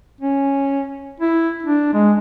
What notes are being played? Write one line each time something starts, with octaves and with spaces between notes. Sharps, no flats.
C#4
E4
D4
G#3